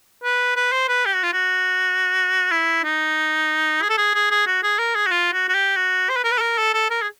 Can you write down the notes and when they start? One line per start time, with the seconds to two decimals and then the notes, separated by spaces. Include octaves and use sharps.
0.24 B4
0.56 B4
0.73 C5
0.89 B4
1.06 G4
1.15 F#4
1.23 F4
1.33 F#4
2.52 E4
2.84 D#4
3.82 G#4
3.90 A4
3.98 G#4
4.15 G#4
4.31 G#4
4.47 F#4
4.63 G#4
4.79 A#4
4.95 G#4
5.07 F#4
5.11 F4
5.33 F#4
5.49 F#4
5.55 G4
5.77 F#4
6.10 C5
6.16 B4
6.24 A#4
6.32 B4
6.38 A4
6.41 A#4
6.58 A4
6.74 A4
6.90 A#4
7.02 G#4